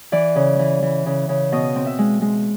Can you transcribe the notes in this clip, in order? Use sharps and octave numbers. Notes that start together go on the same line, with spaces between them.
E3 D5
C#3
E3
E3
C#3
C#3
B2 D#5
C4
E5
G#3
G#3